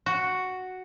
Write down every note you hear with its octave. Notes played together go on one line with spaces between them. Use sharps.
F#4